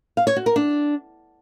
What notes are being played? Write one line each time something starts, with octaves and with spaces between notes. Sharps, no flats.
F5
C#5
F#4
A#4
D4